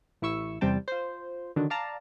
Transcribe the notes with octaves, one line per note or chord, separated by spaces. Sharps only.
A1 E4 C#6 E6
E2 C3 G3 C4 G5 A5
F4 C5
D3 D#3 F#3 D4
D5 F5 A5 A#5